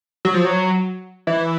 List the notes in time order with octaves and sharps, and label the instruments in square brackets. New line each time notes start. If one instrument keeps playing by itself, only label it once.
[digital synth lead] F#3
F3
F#3
E3